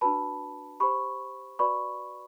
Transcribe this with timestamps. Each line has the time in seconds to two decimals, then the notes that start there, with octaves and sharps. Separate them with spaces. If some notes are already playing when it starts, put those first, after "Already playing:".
0.01 D4 F#4 B4 A5 B5
0.80 G4 C5 B5 C#6
1.59 F#4 B4 D5 B5 C#6